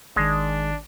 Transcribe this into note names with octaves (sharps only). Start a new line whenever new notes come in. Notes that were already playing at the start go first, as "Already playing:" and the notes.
G#1 D#3 G#3 D4